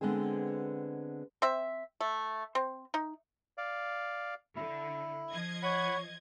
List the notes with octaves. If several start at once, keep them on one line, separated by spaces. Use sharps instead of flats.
D3 G#3 B3 C4 G#4
C4 E5
A3
C4
D#4
D5 F5
D3 E4
F3 D#5 G#6
C#5 F#5 B5